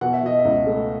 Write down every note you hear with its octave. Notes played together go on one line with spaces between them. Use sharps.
B2 F#5
E5
B2 D#5
E5
C#2
A3